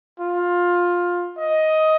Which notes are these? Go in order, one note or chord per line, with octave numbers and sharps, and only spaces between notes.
F4
D#5